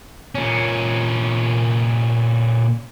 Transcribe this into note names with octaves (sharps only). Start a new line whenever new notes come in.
A#2 C#4